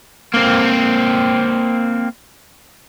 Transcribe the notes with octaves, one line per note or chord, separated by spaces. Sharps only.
A#3 C4